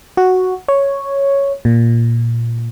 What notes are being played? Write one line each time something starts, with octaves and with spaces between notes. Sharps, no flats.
F#4
C#5
A#2